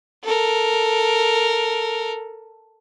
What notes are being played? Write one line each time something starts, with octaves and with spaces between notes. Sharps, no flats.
A4 A#4